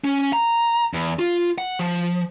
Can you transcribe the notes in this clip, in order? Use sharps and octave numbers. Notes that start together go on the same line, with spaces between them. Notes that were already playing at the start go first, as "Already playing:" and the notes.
C#4
A#5
E2
F4
F#5
F3